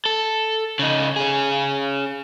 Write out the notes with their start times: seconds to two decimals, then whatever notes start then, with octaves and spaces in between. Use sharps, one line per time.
0.06 A4
0.79 C#3 D#4
1.16 C#4 G#4